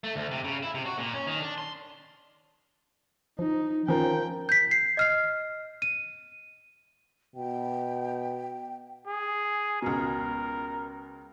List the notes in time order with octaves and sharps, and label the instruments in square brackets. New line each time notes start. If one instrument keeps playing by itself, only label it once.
[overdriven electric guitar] A3
D2
C3
C#3
E4
C3
F#4
A#2
C#4
D#3
D4
C6
[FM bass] F3 [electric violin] D#4
[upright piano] F3 A#4 [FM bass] C#4 [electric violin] G5
[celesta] G6 B6
C7
D#5 F6 C7
D#7
[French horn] B2 [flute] G5
[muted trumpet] G#4
[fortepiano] C#2 B2 [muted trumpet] A#4